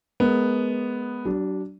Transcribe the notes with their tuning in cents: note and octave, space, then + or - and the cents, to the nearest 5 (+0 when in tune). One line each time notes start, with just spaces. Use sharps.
G#3 +25 B3 +0 A#4 +0
F#3 +45 D4 -10